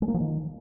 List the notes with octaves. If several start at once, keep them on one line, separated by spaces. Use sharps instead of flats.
G#3
A#3
F3
D#3